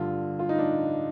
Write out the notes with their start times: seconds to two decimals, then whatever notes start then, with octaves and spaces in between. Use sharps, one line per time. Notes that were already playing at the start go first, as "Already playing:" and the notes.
Already playing: G2 D3 F4
0.39 F4
0.49 D#4
0.58 D4